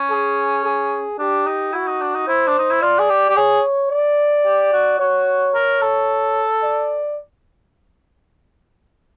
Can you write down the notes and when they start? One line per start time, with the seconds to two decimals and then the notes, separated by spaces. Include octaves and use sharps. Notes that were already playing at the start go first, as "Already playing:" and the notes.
Already playing: C#4
0.11 G#4
0.65 G#4
1.19 D4 G4
1.47 D#4
1.73 E4 F#4
1.87 D#4
2.01 D4
2.15 D#4
2.27 E4 C5
2.47 D4
2.59 D#4
2.71 E4
2.82 F4 D5
2.99 G#4
3.10 G4
3.29 G4
3.36 G#4 C#5
3.91 D5
4.45 G4
4.73 F#4
5.00 F#4 C#5
5.54 A#4
5.81 A4
6.63 D5